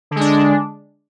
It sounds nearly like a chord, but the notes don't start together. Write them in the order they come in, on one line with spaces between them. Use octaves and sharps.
D3 G#3 D4